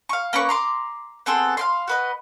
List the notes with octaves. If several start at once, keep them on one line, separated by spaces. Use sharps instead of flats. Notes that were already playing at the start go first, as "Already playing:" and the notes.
F5 C#6
A#3 C#4 B4 C#6
A#5 C6 D6
B3 C4 G#4 A4
F5 G5 C6
F#4 B4 D#5